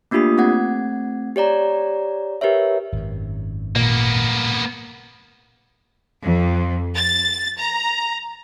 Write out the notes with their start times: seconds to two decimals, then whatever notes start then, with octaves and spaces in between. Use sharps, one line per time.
0.11 A3 A#3 D4 F4 G4 D#6
0.38 A3 C4 F#5 G#6
1.36 G4 C#5 D5 A#5
2.41 G4 A#4 B4 C#5 E5
2.92 G#1 F#2
3.76 A#2 A#3 B3
6.22 F2
6.97 A6
7.59 A#5